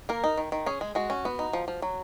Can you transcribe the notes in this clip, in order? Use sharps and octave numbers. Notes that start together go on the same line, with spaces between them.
A#3 A#4
D#4
D#3
D#3
C#4 G#4
G#3
G#3 F#4
C#4
B3
D#4
F3
F3
F#3